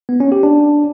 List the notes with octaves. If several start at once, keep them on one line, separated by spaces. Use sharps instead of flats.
B3
C#4
G4
D4